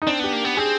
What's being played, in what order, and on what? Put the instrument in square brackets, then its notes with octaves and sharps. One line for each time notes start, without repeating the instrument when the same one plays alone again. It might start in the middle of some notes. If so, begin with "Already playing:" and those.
[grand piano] D#4
[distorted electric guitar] C4 [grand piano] D4
[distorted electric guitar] B3 [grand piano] G4
[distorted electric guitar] A#3
B3
[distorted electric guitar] C4 [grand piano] G#4